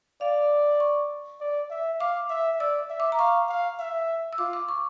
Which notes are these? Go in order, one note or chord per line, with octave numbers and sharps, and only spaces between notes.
D5 F5
C#6
D5
E5
F5 D6
E5
D5 E6
E5
D6
A#5
F5 C#6
F5
E5
E6
F4 D6
D6
C#6